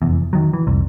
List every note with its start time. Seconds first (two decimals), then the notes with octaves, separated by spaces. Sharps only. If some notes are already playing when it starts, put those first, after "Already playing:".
0.02 F1 E2
0.33 D#3 F#3
0.53 E3
0.67 F1 C2